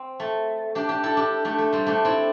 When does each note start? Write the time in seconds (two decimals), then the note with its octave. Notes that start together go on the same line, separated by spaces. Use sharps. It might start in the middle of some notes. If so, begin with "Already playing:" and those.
Already playing: C4
0.20 A3
0.75 D4 G4
0.89 D4 G4
1.03 E4 A4
1.17 D4 G4
1.45 A3 D4
1.58 A3
1.73 G3 C4
1.87 A3 D4
2.05 C4 E4